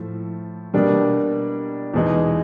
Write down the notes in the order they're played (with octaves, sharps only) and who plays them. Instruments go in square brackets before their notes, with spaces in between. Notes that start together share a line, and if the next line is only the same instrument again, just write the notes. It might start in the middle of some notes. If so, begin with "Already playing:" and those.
Already playing: [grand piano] A2 F3 A3
B2 G3 A#3 D4
E2 B2 G#3 B3 D#4